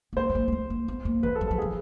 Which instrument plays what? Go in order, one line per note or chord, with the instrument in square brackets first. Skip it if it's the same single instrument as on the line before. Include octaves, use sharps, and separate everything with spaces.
[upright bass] B3
[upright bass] A#3 [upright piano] C5
[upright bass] A3
A#3
A#3
A3
A#3
B3
A#3
[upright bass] E3 [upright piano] B4
[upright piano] A4
[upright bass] F#3
[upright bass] F3 [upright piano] A4
[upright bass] E3 [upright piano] G#4